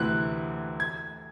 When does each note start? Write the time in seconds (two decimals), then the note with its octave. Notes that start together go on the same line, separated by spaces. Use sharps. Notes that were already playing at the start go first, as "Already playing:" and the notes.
Already playing: D2 C3 E3 F#6
0.80 G#6